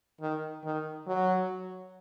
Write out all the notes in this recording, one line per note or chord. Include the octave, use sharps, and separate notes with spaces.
D#3
D#3
F#3